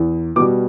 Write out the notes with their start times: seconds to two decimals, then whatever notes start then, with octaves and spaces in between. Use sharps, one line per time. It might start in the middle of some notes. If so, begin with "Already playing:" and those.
Already playing: E2
0.36 B2 D6
0.39 G3